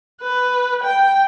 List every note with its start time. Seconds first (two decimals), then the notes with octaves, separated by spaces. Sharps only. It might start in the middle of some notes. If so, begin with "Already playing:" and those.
0.22 B4
0.83 G5